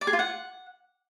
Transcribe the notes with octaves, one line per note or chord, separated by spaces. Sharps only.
D5
G#4
F4
F#5